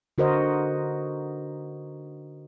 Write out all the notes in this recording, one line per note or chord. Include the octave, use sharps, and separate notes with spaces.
D3 F#4 A#4 C5 D#5